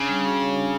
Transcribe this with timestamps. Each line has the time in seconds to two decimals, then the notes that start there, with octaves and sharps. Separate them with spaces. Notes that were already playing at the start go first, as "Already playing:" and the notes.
Already playing: C#3 D4
0.09 G3
0.25 F#4
0.40 C#5
0.56 D4